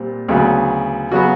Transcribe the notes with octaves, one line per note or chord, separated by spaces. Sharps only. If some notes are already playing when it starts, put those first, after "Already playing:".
Already playing: A#2 G3 C4
D2 C#3 F#3 B3
C#3 F#3 B3 F#4